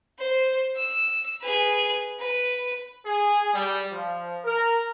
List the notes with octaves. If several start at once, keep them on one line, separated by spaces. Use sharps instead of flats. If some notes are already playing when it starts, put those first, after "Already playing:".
C5
E6
G#4 B4
B4
G#4
G3
F3
A#4